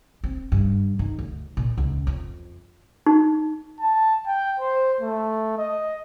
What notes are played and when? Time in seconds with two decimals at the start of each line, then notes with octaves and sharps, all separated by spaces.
0.24 C4
0.52 G2
0.99 D#3
1.19 D2
1.57 A#2
1.78 C#2
2.07 F2
3.06 D#4
3.80 A5
4.27 G5
4.60 C5
5.01 A3
5.58 D#5